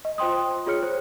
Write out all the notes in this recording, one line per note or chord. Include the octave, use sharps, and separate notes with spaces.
D#5
F4 C5 G5 C6 D#6
F4 G#4 C#5 F6 C#7
C5